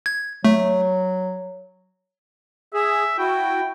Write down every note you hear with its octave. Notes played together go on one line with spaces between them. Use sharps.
G#6
F#3 A3
G#4 E5
E4 F#4 G5